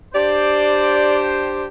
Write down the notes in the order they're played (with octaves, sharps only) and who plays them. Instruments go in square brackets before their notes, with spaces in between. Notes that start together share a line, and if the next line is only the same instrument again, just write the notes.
[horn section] D4 G4 C5 [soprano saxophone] D5